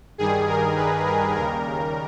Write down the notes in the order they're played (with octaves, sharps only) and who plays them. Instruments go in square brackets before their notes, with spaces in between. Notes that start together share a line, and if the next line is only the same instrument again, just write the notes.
[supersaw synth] G2 D#3 G3 G#4
A#4
B4
A#4
D#2 C#3 G3 A#4